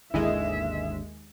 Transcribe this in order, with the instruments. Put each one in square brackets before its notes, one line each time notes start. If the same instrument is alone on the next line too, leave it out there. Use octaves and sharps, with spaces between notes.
[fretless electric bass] G#1 D3 [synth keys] D#2 G#3 [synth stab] E4 G#4 D#5 [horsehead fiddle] E5